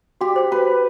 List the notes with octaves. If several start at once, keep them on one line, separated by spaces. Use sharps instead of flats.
F#4 G4
C5 G5
F#4 B4
C5 G5